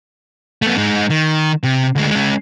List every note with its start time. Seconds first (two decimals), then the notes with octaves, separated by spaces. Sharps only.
0.62 A3 B3
0.78 G#3 D#4
1.10 D#3
1.63 C3
1.95 D2 G#3
2.11 G#3 C#4